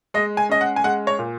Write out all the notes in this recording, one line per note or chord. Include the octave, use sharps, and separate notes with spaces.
G#3 D#5
G#5
C#4 D#5
F#5
G#5
G#3 F#5
C#5
A#2